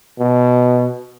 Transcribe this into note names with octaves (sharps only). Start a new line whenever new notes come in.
B2